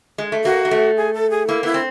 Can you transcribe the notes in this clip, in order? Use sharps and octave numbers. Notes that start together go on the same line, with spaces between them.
G#3
A3
A#3 F#4
A#3
A3
G#4
A4
G#4
A#3 E4
B3 E4
C4